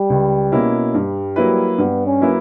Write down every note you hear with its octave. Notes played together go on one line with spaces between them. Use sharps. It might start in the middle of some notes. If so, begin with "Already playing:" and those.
Already playing: G3
C#2
B2 A#3 C#4 E4
G2 G3
F#3 A#3 E4 B4
G2 B3
C#4
F#3 A#3 E4 B4